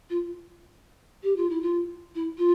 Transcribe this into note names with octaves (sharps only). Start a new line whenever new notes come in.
F4
G4
F4
E4
F4
E4
F4